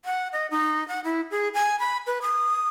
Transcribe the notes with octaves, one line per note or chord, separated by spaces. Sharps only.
F#5
D#5
D#4
F#5
E4
G#4
G#5
B5
B4
D#6